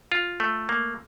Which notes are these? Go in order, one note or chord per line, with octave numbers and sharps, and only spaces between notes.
F4
A3
A#3